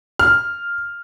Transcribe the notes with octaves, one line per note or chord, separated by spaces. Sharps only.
F6